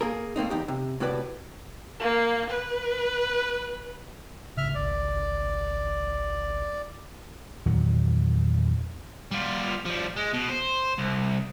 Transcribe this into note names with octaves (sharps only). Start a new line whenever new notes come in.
A#3 G#4 A#4
A3 A#3 C4 D#4
E2 D#4 G4
C3
A2 C3 F#4 B4 D5
A#3
B4
A1 G#2 C#3 E5 F6
G#1 C#2 D5
E2 A#2 D#3 F#3
G3 F4
F3 G3
G#3
B2
C5
C2